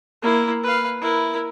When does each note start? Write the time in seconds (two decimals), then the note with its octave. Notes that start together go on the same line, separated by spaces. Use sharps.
0.23 A#3 E4
0.64 B4 F5
1.01 E4 A#4